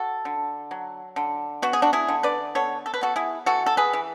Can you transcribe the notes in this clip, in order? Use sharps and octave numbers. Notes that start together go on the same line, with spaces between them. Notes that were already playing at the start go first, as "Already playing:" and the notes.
Already playing: F#4 A4
D3
F#3
D3
B3 F#4
G#4
D4 F#4
E4 G#4
D3
B4 D5
B3 A4 C#5
A4
B4
B3 F#4 A4
E4 G#4
E3 F#4 A4
A4
G#4 B4
E3